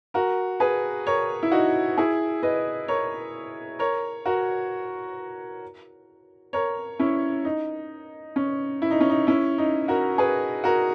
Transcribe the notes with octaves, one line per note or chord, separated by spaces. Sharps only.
F#4 A#4
G#4 B4
A#4 C#5
E4
D#4 F#4
E4 G#4
B4 D#5
A#4 C#5
A#4 C#5
F#4 A#4
A#4 C#5
C#4 E4
D#4
C#4
E4
D#4
C#4
D#4
C#4 E4
D#4
F#4 A#4
G#4 B4
F#4 A#4